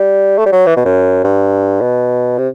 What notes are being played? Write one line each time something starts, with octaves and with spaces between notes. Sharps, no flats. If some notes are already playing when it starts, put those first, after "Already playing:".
Already playing: G3
A3
G3
F#3
E3
B2
F#2
G2
B2
C3